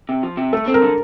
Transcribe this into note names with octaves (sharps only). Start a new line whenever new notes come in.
C3
F3
C3
A3 A4
C4
A#4
D3